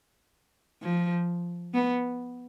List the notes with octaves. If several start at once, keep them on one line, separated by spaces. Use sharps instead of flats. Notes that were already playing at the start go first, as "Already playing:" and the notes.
F3
B3